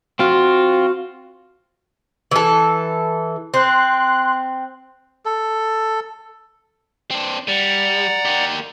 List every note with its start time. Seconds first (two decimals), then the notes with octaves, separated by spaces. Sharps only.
0.19 C4 F4 F#4
2.31 E3 A4
3.54 C4 C6 F#6
5.25 A4
7.11 C4 D4
7.48 G3 D5 F#5 A#5
8.25 A#3 G4